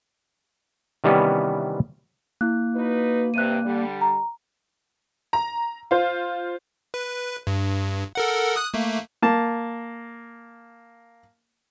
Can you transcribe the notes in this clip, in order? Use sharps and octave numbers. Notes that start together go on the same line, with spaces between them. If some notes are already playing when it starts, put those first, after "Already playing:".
C3 D#3 E3 G3 B3 C#4
A#3 E4 F#6
D#4 F#4 B4
G2 C3 F#6 D#7
D3 G3
A#5
A#5
F4 C5
B4
G2
A4 A#4 F#5
D#6 F#6
A3 A#3
A#3 A5